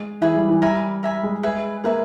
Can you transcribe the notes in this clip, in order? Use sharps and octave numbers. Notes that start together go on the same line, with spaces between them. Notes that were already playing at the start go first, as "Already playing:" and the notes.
Already playing: G#3
E3 G#4 B4 E5 G#5
G3
E3
G3 A#4 E5 G#5 B5
A#4 E5 G#5 B5
G#3
G#4 B4 E5 G#5
A#3 G#4 B4 E5 G#5